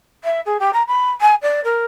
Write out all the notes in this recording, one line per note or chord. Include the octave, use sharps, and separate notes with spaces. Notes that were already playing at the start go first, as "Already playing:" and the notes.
E5
G#4
G4
A#5
B5
G#5
D5
A#4